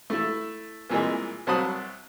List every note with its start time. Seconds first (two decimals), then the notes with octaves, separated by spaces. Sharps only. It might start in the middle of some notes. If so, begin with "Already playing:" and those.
0.10 A3 E4
0.90 C2 A#2 E3 G#3
1.47 C2 F#3 C5 A5 B5 D#6